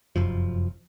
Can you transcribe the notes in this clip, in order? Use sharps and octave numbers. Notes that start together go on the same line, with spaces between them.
F1 F#2 F3